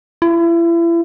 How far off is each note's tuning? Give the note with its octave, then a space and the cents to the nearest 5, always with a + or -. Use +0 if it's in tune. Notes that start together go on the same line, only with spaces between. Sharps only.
E4 +35